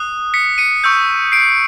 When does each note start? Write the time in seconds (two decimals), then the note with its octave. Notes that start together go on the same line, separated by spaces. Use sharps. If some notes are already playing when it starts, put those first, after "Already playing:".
Already playing: D#6 F#6
0.34 B6 C#7
0.58 C#7 D#7
0.84 C#6 E6 G6
1.32 C7 D7